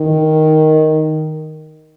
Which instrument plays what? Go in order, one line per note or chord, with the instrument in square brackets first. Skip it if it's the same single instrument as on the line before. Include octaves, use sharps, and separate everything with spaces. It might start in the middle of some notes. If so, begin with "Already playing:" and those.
Already playing: [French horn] D#3